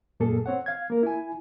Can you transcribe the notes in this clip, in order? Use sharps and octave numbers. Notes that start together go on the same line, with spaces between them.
F#2 A#2 A#3 G#4 A4
C4 C#5 F#5
F5 G#6
A#3 A#4
E4 G#5